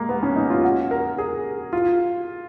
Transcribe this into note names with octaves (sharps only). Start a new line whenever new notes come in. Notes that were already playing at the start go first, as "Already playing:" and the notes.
Already playing: G#3 A#3
B3
C#4
D#4
F4
F#4
A#4
G#4
F4